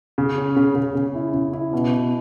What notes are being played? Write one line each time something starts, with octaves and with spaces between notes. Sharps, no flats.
C#3
C#4
C#3
C#3
C#3
E4
C#3
E4
B2
B2